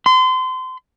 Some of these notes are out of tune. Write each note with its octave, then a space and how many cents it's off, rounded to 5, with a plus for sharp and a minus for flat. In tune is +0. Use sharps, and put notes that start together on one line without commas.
C6 -30